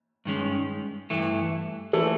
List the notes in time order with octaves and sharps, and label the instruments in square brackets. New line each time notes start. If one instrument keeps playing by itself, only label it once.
[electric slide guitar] G2 D#3 G#3 C#4
G2 E3 A3
[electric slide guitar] E3 A3 [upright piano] A4